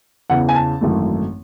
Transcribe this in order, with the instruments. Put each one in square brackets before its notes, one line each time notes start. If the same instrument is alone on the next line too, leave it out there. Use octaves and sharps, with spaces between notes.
[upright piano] E2 C#3 E3 F#5
G#5
A5
G#1 F#2 E3 A3